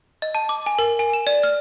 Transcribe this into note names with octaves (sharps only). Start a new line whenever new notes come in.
D#5
A5
D6
G#5
A#4
G#5
E7
D5
F6